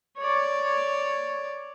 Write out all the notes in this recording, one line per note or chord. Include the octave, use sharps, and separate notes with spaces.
C#5 D5